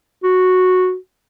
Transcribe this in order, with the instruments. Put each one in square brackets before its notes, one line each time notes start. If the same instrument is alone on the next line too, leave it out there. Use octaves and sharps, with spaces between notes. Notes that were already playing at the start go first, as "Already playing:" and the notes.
[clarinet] F#4